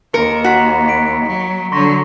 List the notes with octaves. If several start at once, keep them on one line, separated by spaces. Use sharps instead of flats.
D#2 A#4 C#7
F#4 A#5 B6 C#7
B6 D7
F#3
D3 F#3 C6 C#6 A#6